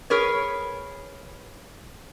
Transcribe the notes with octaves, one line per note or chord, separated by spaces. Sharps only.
G#4 A#4 B4 C#5